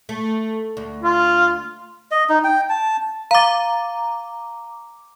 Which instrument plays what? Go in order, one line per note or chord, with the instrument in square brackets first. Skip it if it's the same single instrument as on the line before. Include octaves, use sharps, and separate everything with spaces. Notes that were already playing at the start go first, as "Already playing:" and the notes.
[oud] A3
D2
[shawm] F4
[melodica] D#5
D#4
G5
A5
[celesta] F5 A6 [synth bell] A#5 D6